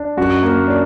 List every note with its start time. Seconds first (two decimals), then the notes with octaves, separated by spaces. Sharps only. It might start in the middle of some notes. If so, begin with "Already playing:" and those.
Already playing: D4
0.17 F#2 F#4
0.43 A#3
0.68 D4